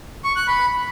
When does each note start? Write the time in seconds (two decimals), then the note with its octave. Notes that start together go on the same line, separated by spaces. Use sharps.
0.24 C#6
0.36 F#6
0.47 B5